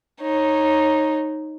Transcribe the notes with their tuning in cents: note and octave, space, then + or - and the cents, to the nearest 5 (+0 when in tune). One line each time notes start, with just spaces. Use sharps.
D#4 +0 C#5 -25